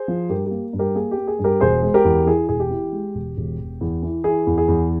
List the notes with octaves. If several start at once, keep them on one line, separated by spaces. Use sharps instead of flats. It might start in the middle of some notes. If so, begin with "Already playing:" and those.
Already playing: G#4 C5
F3
G2 G4 A#4
A#3 G4
G2
G4 A#4
A#3 G#4
G4
A#3
G#4
G2
G4 A#4
E1 G#4 C5
G#3
G4 A#4
E2
E3 G#4
E1 G#4
G4
E3
G#3
E1
E1
E1
E2
E3
E3 G#4
E2
G#4
E2